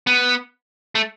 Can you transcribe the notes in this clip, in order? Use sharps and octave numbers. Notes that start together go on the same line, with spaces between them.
B3
A3